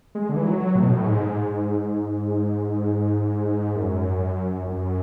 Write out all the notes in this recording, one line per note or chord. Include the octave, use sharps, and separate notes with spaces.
G#3
D3
E3
F#3
A2
B2
A2
G#2
F#2
F#2